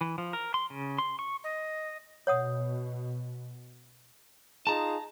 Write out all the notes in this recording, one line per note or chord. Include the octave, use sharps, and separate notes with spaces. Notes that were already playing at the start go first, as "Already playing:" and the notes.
E3
F3
A#4
C6
C#3
C6
C#6
D#5
B2 C#5 F#5 D#6
D#4 F4 G#4 A5 A#5